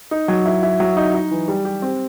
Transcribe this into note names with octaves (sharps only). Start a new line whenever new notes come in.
D#4
F#3
E4
E4
F#3
D#4
D#4
E3
G3
G4
C4